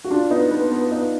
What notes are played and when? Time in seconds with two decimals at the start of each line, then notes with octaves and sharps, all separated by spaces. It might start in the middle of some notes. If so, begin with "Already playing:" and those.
0.04 F#4
0.11 D4 F4
0.31 B3 D#4
0.51 B3
0.72 B3
0.92 B3 D#4